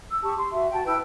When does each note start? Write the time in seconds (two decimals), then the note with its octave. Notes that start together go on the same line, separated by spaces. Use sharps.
0.11 E6
0.23 G4 A5 C#6
0.37 C6
0.52 F#4 E5
0.72 F#4 G5 A5
0.85 E4 B4 G5 E6